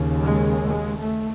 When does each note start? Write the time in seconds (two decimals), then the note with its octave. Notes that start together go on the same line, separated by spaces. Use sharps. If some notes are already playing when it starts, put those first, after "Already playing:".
Already playing: D#2 C#3
0.21 G#3
0.67 G#3
0.98 A3